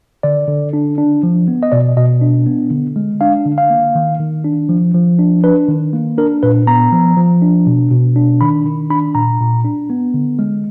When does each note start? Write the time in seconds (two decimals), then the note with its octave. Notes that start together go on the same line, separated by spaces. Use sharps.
0.23 D3 D5
0.48 D3
0.73 D4
0.98 D4
1.23 F3
1.48 B3
1.63 D#5
1.72 B2 D5
1.97 B2 D#5
2.21 D4
2.47 B3
2.71 D3
2.96 G#3
3.21 D4 F5
3.46 D3
3.58 F5
3.70 A#3
3.95 D#3
4.20 D#3
4.44 D4
4.69 F3
4.94 F3
5.19 D4
5.44 D4 B4
5.69 D#3
5.93 A#3
6.18 D4 A#4
6.43 A#2 B4
6.67 B3 A#5
6.92 F3
7.17 F3
7.42 D4
7.67 B2
7.91 B2
8.16 D4
8.41 D#3 B5
8.65 D#3
8.90 D4 B5
9.15 A#2 A#5
9.40 A#2
9.65 D4
9.90 B3
10.14 D3
10.39 G#3